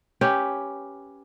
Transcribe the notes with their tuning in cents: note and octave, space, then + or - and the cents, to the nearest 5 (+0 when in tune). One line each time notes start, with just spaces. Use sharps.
C#4 +0 G4 +0 B4 +0